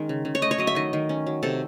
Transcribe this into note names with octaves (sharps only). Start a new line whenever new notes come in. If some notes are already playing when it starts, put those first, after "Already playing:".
Already playing: D#3 G#3 C#4
C#3
C#3
C#5
A3 D#5
C#5
F#3 D#5
E5
D#3 D#5
D#3
C#4
F#3
C3 A4